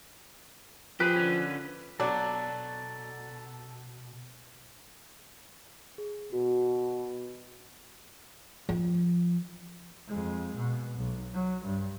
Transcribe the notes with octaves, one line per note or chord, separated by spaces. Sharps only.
F3 G4 G#4 B4
D3 C#4
B2 F#3 D4 A4 D5
G#4
B2 F#4
F3
F2 G#3
B2
B1
F#3
G2